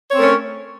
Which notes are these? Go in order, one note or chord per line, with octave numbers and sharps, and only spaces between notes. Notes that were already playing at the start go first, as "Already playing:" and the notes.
A3 C4 C#4 A#4 C#5